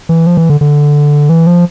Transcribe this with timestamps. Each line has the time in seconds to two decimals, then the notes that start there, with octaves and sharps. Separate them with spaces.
0.09 E3
0.27 F3
0.37 E3
0.50 D3
0.61 D3
1.29 E3
1.47 F3